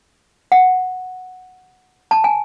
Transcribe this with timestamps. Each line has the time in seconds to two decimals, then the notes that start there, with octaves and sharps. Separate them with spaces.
0.52 F#5
2.11 A5
2.24 G#5